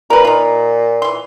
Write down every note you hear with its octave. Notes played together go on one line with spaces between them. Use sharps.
A#2 A#4 B4
D#4 F4
E3 C6